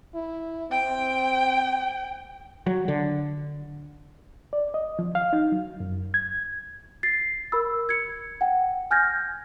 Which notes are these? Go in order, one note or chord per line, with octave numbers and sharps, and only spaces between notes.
E4
C4 G5
F#3
D3
D5
D#5
F3
F5
D#4
F#3
F#2
G#6
A6 C7
A#4 B5 E6
G#6 C#7
F#5 G5
G#5 F6 G6 G#6 A#6